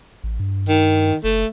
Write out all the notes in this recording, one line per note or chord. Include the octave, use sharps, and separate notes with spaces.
A1
G2
D#3
F#1 A3